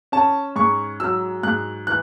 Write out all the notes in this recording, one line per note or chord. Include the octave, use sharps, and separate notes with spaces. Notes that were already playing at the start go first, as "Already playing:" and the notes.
C#4 A5
G#2 C#6
F#3 E6
G#2 F#6
E3 F#6